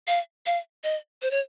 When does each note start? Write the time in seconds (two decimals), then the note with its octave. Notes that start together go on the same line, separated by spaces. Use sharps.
0.08 F5
0.46 F5
0.84 D#5
1.22 C5
1.31 C#5